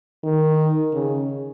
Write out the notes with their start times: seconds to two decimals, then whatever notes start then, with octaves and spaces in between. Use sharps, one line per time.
0.24 D#3
0.93 C#3